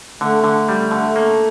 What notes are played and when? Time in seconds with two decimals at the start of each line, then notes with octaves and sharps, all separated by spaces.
0.21 D3 A3
0.44 D3
0.69 G3
0.91 D3
1.16 A#3